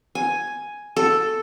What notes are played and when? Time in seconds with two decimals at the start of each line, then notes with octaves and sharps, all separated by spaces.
0.15 G#5
0.97 A4